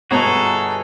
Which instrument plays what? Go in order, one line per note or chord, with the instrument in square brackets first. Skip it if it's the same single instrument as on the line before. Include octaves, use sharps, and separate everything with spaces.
[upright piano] G1 B2 [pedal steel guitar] F#4 G#4 A#5 [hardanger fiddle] A4